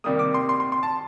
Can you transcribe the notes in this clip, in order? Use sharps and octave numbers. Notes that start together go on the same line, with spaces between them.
C3 D#3 G3 A#3 D#6
D6
C6
C6
C6
C6
A5